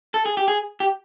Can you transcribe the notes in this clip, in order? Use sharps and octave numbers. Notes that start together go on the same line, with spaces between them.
A4
G#4
G4
G#4
G4